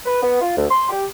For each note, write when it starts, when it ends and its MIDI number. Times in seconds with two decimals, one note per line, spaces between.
0.06 0.20 71
0.23 0.41 59
0.42 0.55 65
0.57 0.65 38
0.70 0.88 84
0.90 1.06 67